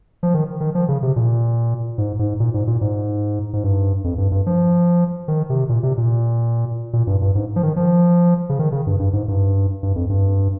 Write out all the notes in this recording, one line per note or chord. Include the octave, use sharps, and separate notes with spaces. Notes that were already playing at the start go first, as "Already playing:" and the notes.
F3
D#3
D#3
F3
C#3
C3
A#2
G#2
G#2
A#2
G#2
A#2
G#2
G#2
G2
F2
G2
G2
F3
D#3
C3
A#2
C3
A#2
A#2
G2
G2
G#2
F3
D#3
F3
C#3
D#3
C#3
G2
G2
G#2
G2
G2
F2
G2